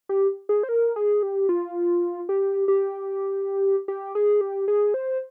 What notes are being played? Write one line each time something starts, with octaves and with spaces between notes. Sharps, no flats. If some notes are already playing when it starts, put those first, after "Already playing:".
G4
G#4
C5
A#4
G#4
G4
F4
G4
G4
G4
G#4
G4
G#4
C5